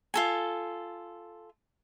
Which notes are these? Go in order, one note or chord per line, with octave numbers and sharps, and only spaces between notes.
F4 A4 G#5